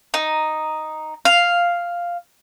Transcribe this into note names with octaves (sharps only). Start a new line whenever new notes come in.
D#4
F5